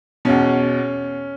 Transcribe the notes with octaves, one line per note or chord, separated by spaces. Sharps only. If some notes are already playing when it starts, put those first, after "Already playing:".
E2 B2 C#4